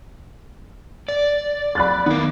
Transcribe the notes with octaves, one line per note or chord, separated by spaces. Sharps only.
D5
B5 F#6 A6
D#3 B3 A#4